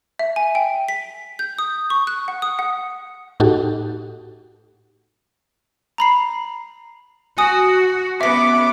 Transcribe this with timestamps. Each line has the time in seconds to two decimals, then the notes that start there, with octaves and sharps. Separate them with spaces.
0.19 E5
0.36 G#5
0.55 G5
0.89 B6
1.39 G6
1.58 D#6
1.90 C#6
2.07 F#6
2.28 F#5
2.42 D#6
2.59 F#5
3.40 A2 D#4 F#4 G4 A4
5.98 A#5 B5 C7
7.38 F#4 G#5 D#6
8.21 B3 C#4 E5 D6 B6